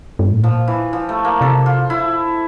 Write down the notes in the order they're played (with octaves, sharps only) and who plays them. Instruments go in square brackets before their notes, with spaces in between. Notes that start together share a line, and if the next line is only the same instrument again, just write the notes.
[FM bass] G2
A2
[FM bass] A#2 [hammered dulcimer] F3
[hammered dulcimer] E3
F3
A3
A#3
[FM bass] C3 [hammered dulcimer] A4
[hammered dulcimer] F4
E4